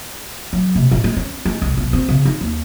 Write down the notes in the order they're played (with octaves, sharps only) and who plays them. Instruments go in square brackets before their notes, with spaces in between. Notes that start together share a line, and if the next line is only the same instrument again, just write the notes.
[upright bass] F#3
C3
A1
G#3
C#4
G#3
C2
B1
C4
C#3
D#4
D#2